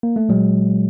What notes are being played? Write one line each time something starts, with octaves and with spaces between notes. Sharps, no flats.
A#3
A3
A#2 F#3 G#3